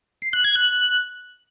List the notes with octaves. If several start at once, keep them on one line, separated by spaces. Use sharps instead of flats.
C7
F#6
G#6
F#6